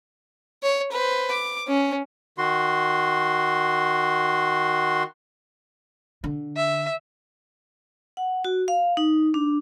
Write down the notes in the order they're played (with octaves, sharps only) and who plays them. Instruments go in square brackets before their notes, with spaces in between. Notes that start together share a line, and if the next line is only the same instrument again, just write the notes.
[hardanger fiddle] C#5
B4 C5
D6
C#4
[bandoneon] D#3 F#4 C6
[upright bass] D3
[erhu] E5
[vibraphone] F#5
F#4
F5
D#4
D4